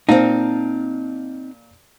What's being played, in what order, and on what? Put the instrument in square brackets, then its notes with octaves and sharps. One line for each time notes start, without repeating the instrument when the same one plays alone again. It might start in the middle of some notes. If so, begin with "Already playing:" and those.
[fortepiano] A#2 F5 A5 [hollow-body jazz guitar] C4 D#4